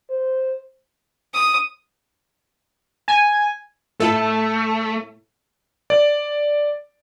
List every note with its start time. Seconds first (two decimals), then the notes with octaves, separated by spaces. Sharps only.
0.10 C5
1.34 D#6
3.08 G#5
4.00 A2 A3 E4 A4
5.90 D5